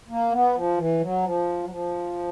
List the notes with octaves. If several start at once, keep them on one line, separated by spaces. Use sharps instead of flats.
A#3
B3
F3
E3
F#3
F3
F#3
F3